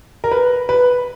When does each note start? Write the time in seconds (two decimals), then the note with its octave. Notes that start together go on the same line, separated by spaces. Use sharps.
0.24 A#4
0.31 B4
0.69 B4